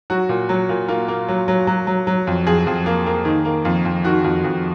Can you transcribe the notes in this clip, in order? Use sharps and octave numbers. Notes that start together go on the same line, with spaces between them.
F#3 F#4
A#2
F#3
A#2
A#3 F4
A#3
F#3
F#3
F#3
F#3
F#3
F2
F2 G#4
F2
A#3
A#3
D#3
A#3
F2
F2
D#3 F#4
F2
F2